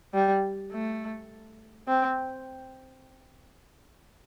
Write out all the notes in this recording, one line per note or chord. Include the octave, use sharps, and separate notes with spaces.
G3
A3
C4